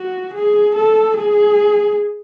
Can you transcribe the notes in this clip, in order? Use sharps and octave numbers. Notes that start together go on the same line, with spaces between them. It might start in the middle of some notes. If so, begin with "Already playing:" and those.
Already playing: F#4
G#4
A4
G#4